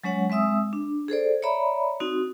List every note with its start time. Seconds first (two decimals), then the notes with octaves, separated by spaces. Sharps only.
0.04 F#3 G#3 C#4 C#5 F#5
0.30 G#3 C4 E5 D#6 E6
0.73 D4
1.08 G#4 A4 C5 D5
1.42 C#5 D5 E5 A#5 B5
2.00 C4 D#4 F#4